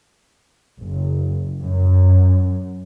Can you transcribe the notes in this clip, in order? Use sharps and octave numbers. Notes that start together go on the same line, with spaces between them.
F#1
F#2